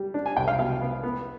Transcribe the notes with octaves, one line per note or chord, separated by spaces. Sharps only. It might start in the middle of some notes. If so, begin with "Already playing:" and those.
Already playing: G3
D4
G#5
C2 G5
F5
B2 F5
B3
B3